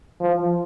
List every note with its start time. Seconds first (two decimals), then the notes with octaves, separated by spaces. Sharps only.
0.20 F3